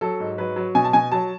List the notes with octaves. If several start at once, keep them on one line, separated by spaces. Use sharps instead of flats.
F#3 A4
G#2
F#3 B4
F#3
B2 G#5
A5
B2 G#5
F#3 A5